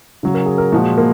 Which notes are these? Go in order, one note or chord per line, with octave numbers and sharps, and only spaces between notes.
C#3 F#3
A#4
G#4
A#4
A#2 F3 G#3 F#4
A#3